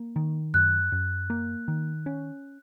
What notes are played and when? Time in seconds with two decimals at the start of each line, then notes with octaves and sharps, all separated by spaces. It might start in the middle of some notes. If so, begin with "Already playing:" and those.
Already playing: A#3
0.16 D#3
0.54 F#2 F#6
0.92 F#2
1.30 A#3
1.68 D#3
2.06 C#4